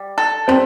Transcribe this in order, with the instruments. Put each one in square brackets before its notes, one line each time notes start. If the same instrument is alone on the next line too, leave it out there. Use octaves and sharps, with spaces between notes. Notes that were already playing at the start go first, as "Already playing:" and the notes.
Already playing: [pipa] G3
A4
[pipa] G3 [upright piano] C4